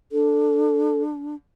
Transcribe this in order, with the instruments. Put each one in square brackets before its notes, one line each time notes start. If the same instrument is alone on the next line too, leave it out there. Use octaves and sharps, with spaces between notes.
[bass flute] D4 [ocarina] A4